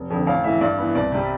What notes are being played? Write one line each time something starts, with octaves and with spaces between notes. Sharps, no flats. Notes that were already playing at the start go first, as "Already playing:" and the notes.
Already playing: F1
F2 D3
A1 F5
A2 E3 E5
G2 D5
E3 B3
C2 D5
C3 G3